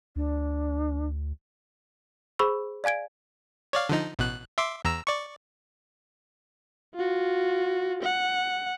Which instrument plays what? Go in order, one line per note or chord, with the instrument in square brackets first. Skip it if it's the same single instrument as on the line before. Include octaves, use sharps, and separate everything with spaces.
[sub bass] D2 [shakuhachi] D4
[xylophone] G#4 C5 B5 C#6 E6
D5 F5 G#5 G#6 D7
[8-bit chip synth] C#5 D5 F5
D3 F3 D#4
A1 B2 F#6
E5 C6 D6
E2 A#5 E6
D5 C#6
[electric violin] F4 F#4
F#5